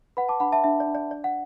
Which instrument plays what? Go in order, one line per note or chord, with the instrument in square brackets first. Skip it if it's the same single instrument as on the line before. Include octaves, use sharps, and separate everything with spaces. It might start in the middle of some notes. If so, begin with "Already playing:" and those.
[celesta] B4 F#5 B5
A5 D6
D4 F#5 B5
E5 A5
D4 E5
D5
D4
D5
D5
F#5